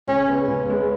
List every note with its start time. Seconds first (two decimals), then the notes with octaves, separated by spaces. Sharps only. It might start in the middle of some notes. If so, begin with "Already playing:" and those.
0.07 C#2 C#4
0.28 C#3 G#3 B3
0.47 C#2
0.69 C#3 G#3 B3